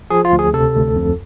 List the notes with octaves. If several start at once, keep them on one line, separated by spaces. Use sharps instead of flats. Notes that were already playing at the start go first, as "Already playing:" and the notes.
F3 G#4
F4
D2
G#4
C3 A4
D2
F2